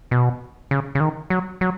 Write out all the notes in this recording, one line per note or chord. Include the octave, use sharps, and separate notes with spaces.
B2
C#3
C#3
D#3
F#3
F#3